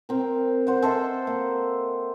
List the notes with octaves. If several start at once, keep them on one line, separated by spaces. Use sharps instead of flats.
C4 A#4
C5 F#5
A4 C5 D#5 E5
A#3